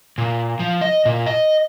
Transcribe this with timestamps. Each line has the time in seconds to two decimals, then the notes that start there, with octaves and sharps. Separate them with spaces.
0.18 A#2
0.59 F3
0.81 D#5
1.05 A#2
1.26 D#5